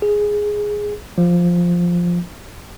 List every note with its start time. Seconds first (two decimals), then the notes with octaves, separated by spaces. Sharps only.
0.02 G#4
1.18 F3